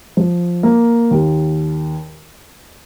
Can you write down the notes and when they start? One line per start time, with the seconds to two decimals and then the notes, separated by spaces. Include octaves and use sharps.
0.17 F3
0.63 A#3
1.11 D#2